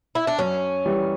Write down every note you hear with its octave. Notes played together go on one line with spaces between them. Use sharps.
E4
D4
F#2 C#4
E3 G3